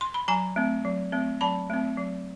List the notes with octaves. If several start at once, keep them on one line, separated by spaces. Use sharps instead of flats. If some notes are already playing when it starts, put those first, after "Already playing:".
C6
B5
F#3 G#5 A#5
A3 C4
F#3
A3 C4
F#3 A5 B5
A3 C4
F#3